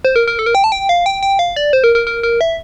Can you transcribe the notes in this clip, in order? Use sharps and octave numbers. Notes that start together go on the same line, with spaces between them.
C5
A#4
A#4
A4
A#4
G5
A5
G5
F5
G5
G5
F5
D5
C5
A#4
A#4
A#4
A#4
E5